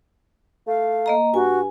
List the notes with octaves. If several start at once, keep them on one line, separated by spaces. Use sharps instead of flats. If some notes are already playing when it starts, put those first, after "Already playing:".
A3 F5
A#3 D#5 A#5
G2 F#4 G#5